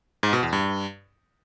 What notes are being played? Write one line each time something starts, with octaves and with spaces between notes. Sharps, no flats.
G#2
B2
E2
G2